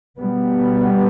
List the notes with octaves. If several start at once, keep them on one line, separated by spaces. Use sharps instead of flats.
B2 G3 B3